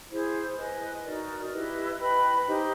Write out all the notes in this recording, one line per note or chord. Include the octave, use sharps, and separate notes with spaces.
E4 G#4 C5
B4 D#5 G#5
D#4 F#4 A#4 D5
E4 G4 B4 D#5
B4 D#5 G5 B5
D#4 G4 C5 D#5